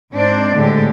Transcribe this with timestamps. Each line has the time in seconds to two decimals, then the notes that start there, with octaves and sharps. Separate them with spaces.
0.12 G#2 C4 D4 C5 D5
0.55 A2 D3 G#3 G4